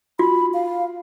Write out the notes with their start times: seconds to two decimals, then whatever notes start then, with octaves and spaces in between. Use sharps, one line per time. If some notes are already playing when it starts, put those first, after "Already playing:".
0.19 F4 F#4 B5
0.54 F5